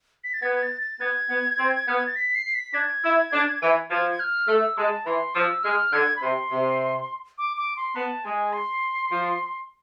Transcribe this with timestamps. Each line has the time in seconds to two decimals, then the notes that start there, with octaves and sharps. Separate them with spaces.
0.24 B6
0.34 A6
0.42 B3 G#6
0.55 G#6
0.63 A6
0.81 A6
1.00 B3 G#6
1.29 B3
1.59 C4
1.88 B3 F6
1.97 G#6
2.07 A6
2.16 B6
2.35 C7
2.54 B6
2.74 D4 G#6
3.04 E4
3.33 D4
3.62 E3
3.90 F3 G#6
4.11 G#6
4.20 F6
4.48 A3 E6
4.77 G#3 A5
5.05 E3 C6
5.35 F3 E6
5.63 G#3 F6
5.93 D3 G#6
6.16 B5
6.22 C3 C6
6.51 C3
7.38 D6
7.57 D6
7.77 C6
7.96 B3 A5
8.24 G#3 G#5
8.53 C6
9.11 F3